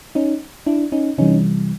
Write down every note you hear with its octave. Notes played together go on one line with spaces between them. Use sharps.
C#4 D#4
D4 E4
C#4 D#4
C3 E3 G3 C#4 D#4